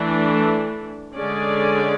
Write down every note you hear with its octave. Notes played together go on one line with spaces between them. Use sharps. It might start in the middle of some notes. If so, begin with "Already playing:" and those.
Already playing: E3 A3 D4
D3 G#3 C#4 G#4 D5